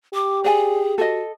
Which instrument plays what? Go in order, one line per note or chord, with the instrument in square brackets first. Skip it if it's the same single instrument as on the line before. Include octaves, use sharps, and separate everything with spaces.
[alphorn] G4 [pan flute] D6
[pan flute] G#4 [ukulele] D5 G#5
[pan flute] F#4 [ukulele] A4 D#5